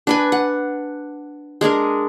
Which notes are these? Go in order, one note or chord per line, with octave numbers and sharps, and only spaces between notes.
D4 B4 G#5
F#5
G#3 D4 G#4 A#4